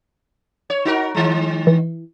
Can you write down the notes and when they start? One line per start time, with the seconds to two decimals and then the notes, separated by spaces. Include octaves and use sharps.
0.70 C#5
0.85 D#4 F#4 A#4
1.15 D#3 G#3
1.67 E3